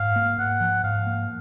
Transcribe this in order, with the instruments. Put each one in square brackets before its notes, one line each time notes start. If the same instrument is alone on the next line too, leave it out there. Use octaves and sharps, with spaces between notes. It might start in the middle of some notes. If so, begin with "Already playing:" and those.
Already playing: [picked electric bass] G#2 [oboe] F5
[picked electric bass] A#3
[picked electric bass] G#2 [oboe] F#5
[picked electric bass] F3
[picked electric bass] G#2 [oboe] F5
[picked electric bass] A#3